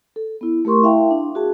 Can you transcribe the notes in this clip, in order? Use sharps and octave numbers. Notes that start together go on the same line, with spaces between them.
A4
B3 E4
A3 G4 A#4 C6 C#6
E4 E5 F5 G5 A5
D4
F#4 G#4 A5